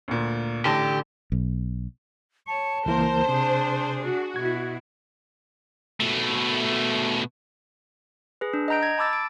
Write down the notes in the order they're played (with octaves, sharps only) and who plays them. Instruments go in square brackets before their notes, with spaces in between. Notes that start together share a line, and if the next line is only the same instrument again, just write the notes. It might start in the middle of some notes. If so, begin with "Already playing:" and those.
[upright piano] D2 A#2
[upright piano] A1 A5 A#6 [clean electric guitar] D3 [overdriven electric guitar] G4
[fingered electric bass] B1
[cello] C#5 [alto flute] A5
[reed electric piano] C#2 E3 A#3 [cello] A#4 [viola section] C5
[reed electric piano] C3 [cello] D4 G#4
[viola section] F#4
[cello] B2 E4 [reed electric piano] G#6
[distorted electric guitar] B2 A3
[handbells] G#4 B4
D4
D#5 F#5 A#5 G6 D7
G#6
A5 B5 D6 E6 A6
D7